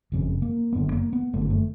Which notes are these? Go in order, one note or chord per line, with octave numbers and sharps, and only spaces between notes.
F#1 F2 C#3
A#3
F#1 F#2 D3 B3
A#3
B3
G1 F#2 D3 A3
A#3
A3